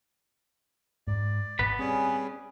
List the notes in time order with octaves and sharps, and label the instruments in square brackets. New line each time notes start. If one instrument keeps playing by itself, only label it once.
[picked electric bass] G#2 [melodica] D5
[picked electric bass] G#1 A#2 [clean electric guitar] B3 B4 B5
[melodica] G3 C#4 G#4 [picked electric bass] C4